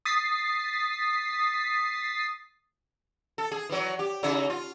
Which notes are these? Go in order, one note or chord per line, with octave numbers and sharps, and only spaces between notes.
D#6 A6 B6 C7
A4
G#4
E3 F#3
G4
C#3 D#4 E4
F4